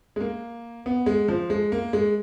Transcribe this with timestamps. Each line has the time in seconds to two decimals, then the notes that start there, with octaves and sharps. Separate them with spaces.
0.16 G#3
0.20 A#3
0.86 B3
1.06 G#3
1.28 F3
1.50 G#3
1.72 A#3
1.93 G#3